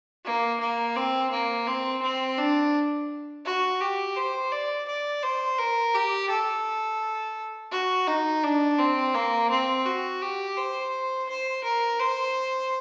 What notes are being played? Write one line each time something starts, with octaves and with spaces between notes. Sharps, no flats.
A#3
A#3
C4
A#3
C4
C4
D4
F#4
G4
C5
D5
D5
C5
A#4
G4
A4
F#4
D#4
D4
C4
A#3
C4
F#4
G4
C5
C5
A#4
C5